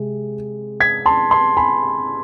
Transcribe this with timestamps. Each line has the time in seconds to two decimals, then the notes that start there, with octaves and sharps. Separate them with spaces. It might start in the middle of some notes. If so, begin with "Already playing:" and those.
Already playing: C3 G#3
0.80 G#6 B6
1.06 A5 C6
1.31 A5 C6
1.57 G#5 B5